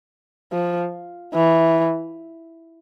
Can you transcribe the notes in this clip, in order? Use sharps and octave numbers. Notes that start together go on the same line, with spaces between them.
F3
E3